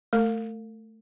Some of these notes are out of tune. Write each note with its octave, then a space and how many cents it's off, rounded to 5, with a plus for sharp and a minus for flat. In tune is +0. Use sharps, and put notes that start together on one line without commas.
A3 +0 A#4 -40